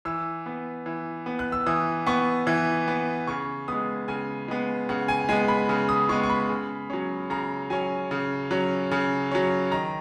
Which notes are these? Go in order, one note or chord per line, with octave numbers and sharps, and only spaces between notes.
E3 E6
B3
E3
B3
F#6
E6
E3 D#6
B3 C#6
E3
B3
C#3 C#6
G#3 B3 D#6
C#3 G#5
G#3 B3
C#3 F#5
G#5
G#3 B3 G#5
B5
C#3
D#6
G#3 B3 C#6
C#6
B5
C#3
F#3 C#4
C#3 A#5
F#3 C#4 G#5
C#3
F#3 C#4
C#3
F#3 C#4
D#3 A#5